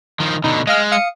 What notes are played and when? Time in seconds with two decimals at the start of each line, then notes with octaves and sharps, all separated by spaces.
0.20 D#3 F3
0.44 B2 D3 D#4
0.67 G#3 D#5 F5 F6
0.92 F5 D#6 C#7